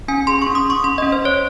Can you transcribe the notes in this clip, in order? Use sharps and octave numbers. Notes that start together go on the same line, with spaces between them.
C#4 G#5
G#4 C6
C#6
C#4
D#6
C#4 C#6
C#4 C6
C#4 D#5
C5
C#4 C#5